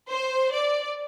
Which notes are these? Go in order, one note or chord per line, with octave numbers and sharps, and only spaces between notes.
C5
D5